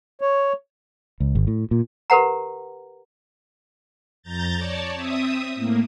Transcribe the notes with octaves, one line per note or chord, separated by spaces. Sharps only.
C#5
C#2
G#1
A2
A#2
G4 A#4 B4 F#5 A#5
F2 A#5 G6 A6
C#5 D5 A5
C4 E5 D#6
A2 A#3